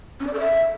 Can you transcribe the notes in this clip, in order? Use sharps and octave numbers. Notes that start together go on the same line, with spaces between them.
C#4
D5
A4
E5